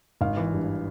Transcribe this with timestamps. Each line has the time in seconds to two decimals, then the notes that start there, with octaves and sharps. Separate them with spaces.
0.21 G#1 F5
0.37 E3
0.53 G2